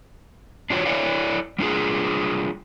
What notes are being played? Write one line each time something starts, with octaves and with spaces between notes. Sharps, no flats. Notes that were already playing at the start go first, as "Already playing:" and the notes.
D4 F4 F#4 B4 C#5
E4 A4 C#5 D5 F5
G3 D4 F4 G#4